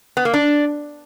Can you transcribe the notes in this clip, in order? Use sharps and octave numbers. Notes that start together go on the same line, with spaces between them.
B3
A#3
D4